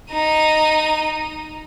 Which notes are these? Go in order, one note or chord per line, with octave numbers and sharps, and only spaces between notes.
D#4 D#7